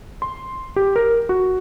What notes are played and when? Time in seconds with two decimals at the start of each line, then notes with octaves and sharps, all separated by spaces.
0.22 C6
0.76 G4
0.96 A#4
1.29 F#4